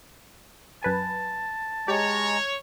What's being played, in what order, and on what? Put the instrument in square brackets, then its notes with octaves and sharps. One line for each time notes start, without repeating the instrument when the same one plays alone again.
[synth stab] F#2 B4 G#5 [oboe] A5
[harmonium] G#3 A#5 [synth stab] G4 [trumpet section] C#5